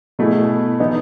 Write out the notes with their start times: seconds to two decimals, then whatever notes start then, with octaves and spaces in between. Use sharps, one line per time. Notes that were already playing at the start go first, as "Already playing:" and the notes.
0.19 B2 A3 E4 G#4
0.80 E3 B3 D#4